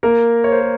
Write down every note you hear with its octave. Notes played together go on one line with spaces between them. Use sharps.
A#3 A#4
C#5
C5
A#4